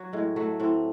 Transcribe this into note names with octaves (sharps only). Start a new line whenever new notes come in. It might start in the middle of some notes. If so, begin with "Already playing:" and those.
Already playing: F#3 F#4
A2 G#3
F#3 A3
A2 C4